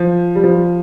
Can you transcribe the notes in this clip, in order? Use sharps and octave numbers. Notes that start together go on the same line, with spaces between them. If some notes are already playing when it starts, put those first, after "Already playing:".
Already playing: F3
G3
F3